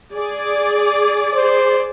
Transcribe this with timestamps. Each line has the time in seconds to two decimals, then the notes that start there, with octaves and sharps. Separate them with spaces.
0.15 G#4 D5
1.34 C5